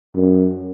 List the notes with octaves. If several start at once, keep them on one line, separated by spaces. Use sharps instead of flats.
F#2